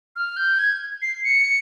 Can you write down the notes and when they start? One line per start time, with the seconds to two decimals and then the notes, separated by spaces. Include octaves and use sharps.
0.16 F6
0.37 G6
0.59 G#6
1.02 C7
1.24 C#7